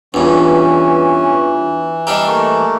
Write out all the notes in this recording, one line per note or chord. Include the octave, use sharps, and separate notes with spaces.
E2 G2 E3 C#4 D4 F4
G3 D4 G4 D#5 F5 A#5 E6
A3 A#3 C#6